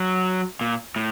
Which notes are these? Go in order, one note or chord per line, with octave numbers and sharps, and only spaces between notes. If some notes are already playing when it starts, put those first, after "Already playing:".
Already playing: F#3
A#2
A2